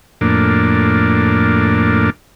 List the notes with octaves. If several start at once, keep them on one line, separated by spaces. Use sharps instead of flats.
F2 A2 A#3 D4